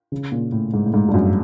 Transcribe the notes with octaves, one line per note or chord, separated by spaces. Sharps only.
C#3
A#2
A2
G#2
A2
G#2
G2
F#2